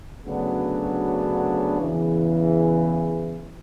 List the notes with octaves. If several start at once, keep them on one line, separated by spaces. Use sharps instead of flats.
D2 C#3 F#3 B3 D4
E2 C#3 E3